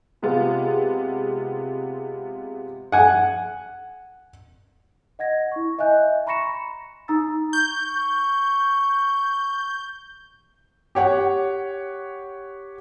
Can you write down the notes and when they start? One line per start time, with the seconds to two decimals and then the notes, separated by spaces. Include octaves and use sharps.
0.22 C3 G#3 B3 F4
2.92 F#5 G#5
5.19 D#5 F#5 G#6 A#6
5.52 E4 C#6
5.79 D#5 E5 G#5 F#6 G6
6.27 A#5 B5 C#6 A#6 C#7 E7
6.40 C6
7.08 D#4 A#5 D#6 E6 A6
7.53 C#6 G6
10.95 G4 C#5 F#5